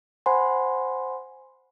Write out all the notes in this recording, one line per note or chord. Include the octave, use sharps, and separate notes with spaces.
C5 F#5 G#5 B5 C6